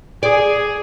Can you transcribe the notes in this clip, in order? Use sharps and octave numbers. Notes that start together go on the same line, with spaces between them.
G#4 D5